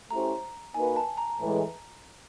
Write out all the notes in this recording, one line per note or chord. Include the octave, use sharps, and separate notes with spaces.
A3 C#4 E4 G4 C5 A#5
A#3 D#4 F#4 B4 G#5
A5
A#5
A2 E3 G#3